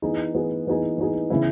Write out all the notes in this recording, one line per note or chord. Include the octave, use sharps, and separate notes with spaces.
E3 B3 D#4 G#4
E3 B3 D#4 G#4
E3 B3 D#4 G#4
E3 B3 D#4 G#4
C#3 E3 B3 E4